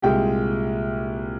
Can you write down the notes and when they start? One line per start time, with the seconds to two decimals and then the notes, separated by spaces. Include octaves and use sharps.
0.02 C2 A#2 G#3 G4 G5